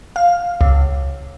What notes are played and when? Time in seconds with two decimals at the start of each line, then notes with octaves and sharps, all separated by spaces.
0.16 F5
0.61 C#2